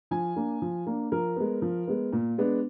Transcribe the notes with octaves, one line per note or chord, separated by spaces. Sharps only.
F3 G#5
A#3 D4
F3
A#3 D4
F3 A#4
G#3 B3
F3
G#3 B3
A#2
G#3 B3 D4